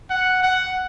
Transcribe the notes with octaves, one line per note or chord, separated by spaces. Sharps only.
F#5
F#5